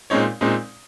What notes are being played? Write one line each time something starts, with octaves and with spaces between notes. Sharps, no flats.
A#2 G#3 C4 D#4 C#5
A#2 G#3 C4 D#4